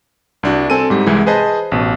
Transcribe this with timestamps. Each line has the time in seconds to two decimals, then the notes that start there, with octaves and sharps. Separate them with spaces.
0.43 C2 D4 F#4
0.70 C4 A4 G#5 D#7
0.90 G#2 G3
1.06 C2 E3 G#3 E4
1.26 G#4 B4 C5 D#5 A5
1.72 A1 B2